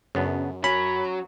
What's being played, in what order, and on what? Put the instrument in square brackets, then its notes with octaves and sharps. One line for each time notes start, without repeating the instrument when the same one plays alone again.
[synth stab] F#2 [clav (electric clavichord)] C#3 B3 D4
[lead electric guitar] F#3 [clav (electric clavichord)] C#4 [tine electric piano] B5